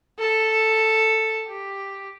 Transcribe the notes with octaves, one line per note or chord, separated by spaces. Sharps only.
A4
G4